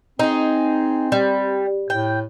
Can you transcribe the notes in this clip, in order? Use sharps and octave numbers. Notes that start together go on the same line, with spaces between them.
C4 D#4 G#4
G3
A2 G5